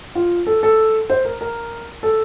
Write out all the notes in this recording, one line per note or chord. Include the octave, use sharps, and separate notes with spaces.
F4
A4
A4
C5
A#4
A#4
A4